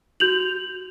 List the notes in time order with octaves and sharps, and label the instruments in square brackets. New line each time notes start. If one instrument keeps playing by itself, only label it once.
[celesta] F#4 G6 F7 F#7